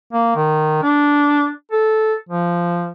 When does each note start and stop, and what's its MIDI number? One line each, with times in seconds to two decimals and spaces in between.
0.13 0.34 58
0.36 0.78 51
0.83 1.50 62
1.72 2.14 69
2.29 2.92 53